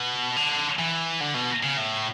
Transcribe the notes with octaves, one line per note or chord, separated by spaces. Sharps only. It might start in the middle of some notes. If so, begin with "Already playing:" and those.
Already playing: B2
D3
E3
D3
B2
C#3
A2